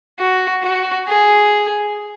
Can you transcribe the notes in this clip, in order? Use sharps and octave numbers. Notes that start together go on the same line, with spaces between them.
F#4
F#4
G#4